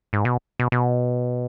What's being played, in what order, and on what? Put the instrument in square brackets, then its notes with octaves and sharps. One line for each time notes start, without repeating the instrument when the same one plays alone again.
[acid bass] G#2
B2
B2
B2